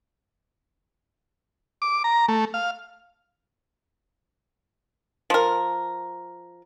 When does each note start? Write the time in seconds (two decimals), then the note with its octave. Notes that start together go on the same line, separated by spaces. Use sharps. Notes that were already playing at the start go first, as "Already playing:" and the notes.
1.82 D6
2.04 A#5
2.28 A3
2.54 F5
5.30 F3 A#4